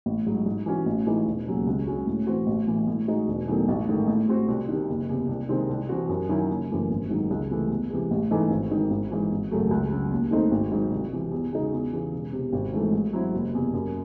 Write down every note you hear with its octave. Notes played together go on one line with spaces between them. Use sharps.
A1
G#2 F#3
G#2
E3 G#3 C#4 F#4
A1
A2 E3 G#3 D#4
E1
D#2 C#3 F#3 C#4
C#2
C#3 G#3 C#4 F#4
A2
E3 C4 F#4
A1
A2 E3
A2
G#3 D#4 F#4
E1
E2 D#3 F#3 A3
A1
G#2 D#3 A3
A2
G#3 C4 F#4
C2
C3 D#3
F#1
E2 C3
C2
C3 D#3 G#3 C4
C2
C3 E3 C4 F#4
F#2
D#3 F#3 C#4 E4
F#1
F#2 E3 A3
G#1
G#2 D#3 F#3
C#2
C3 E3 A3
E2
C3 E3 G#3
A1
G#2 E3 A3 D#4
G#1
G#2 D#3
G#1
G#2 E3
G#1
F#2 C#3 F#3 A3
C#2
C#3 F#3 C#4
D#2
D#3 A3 C4 D#4
G#1
G#2 D#3 F#3
C2
C3 E3
E2
C#3 G#3 D#4 F#4
E2
C#3 E3
E1
E2 C3
G#1
G#2 E3 A3
G#2
F#3 C4 E4
F#1
E2 C3
F#2